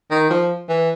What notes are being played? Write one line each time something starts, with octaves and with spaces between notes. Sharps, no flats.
D#3
F3
E3